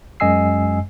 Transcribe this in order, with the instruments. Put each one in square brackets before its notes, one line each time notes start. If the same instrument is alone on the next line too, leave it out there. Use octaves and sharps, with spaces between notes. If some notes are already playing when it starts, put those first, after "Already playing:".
[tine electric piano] F#2 G#3 D#5 G#5 E6 C7